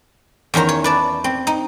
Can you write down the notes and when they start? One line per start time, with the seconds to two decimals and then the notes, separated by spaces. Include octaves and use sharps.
0.54 E2 D#3 C#4 C5 A#5
0.69 C#5
0.84 B4 D5 A5
1.24 C4
1.47 D#4